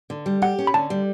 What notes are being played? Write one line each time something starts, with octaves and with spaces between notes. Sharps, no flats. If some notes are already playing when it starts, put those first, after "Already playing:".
D3
G3
G4 F#5
C#4
B5
D3 A5
G3